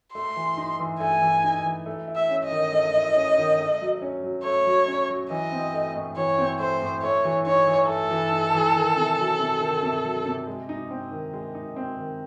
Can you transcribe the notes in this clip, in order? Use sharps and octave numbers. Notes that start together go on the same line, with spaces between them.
A3 C6
E3
D#4
E3
A3 G#5
E3
D#4
E3
A3
E4
E5
C#4
D#5
D#3
A3
E4
C#4
D#3
A3
F#3
C#4
F#3
A3 C#5
F#3
C#4
F#3
E3 D#5
C4
A3
A2
E3 C#5
C4
A3 C5
A2
A3 C#5
E3
D#4 C#5
E3
A3 A4
E3
D#4
E3
D#3
C3
F#3
C3
D#3
C3
F#3
C3
G#3
D#4
C4
D#3
G#3
D#4
C4
D#3